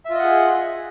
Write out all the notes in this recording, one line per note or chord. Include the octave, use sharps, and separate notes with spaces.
F4 G#4 D#5 E5 F#5